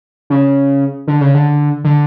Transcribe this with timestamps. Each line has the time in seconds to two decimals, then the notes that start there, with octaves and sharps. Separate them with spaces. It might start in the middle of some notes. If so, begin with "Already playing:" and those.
0.30 C#3
1.07 D3
1.21 C#3
1.34 D3
1.84 D3